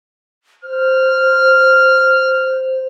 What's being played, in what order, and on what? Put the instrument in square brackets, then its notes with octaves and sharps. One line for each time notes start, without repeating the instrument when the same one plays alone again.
[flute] C5 [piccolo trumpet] F6